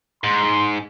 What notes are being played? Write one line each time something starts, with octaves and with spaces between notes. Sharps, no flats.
G#2 C6